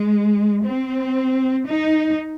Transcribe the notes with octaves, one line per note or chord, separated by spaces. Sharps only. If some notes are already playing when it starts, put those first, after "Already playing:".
Already playing: G#3
C4
D#4